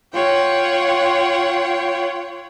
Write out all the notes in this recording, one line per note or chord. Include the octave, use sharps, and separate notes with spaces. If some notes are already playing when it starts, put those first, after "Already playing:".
F4 C#5 F#5 G5